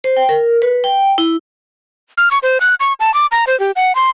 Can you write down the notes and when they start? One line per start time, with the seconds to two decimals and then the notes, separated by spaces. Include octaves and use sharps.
0.04 C5
0.17 G5
0.29 A#4
0.62 B4
0.84 G5
1.18 E4
2.18 F6
2.31 C#6
2.43 C5
2.61 F#6
2.80 C#6
3.00 A5
3.14 D6
3.32 A#5
3.47 C5
3.60 G4
3.76 F#5
3.95 C6